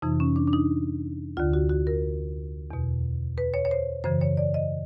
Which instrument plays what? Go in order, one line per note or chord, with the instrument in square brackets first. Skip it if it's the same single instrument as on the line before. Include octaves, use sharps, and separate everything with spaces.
[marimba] F2 C3 E3 D#4
C#4
D4
D4
D#4
D2 D3 F4
F#4
F#4
A#4
E2 B2
B4
C#5
C#5
C5
F#2 C#3 E3 C5
C#5
D5
D#5